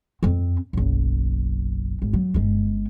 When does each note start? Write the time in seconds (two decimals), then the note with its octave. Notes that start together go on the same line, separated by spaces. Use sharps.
0.23 F2 C4
0.73 F#1 B1
2.02 G#1
2.13 F#3
2.34 G1 G#3